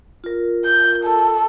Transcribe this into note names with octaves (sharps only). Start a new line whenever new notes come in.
F4 A#4
G6
A4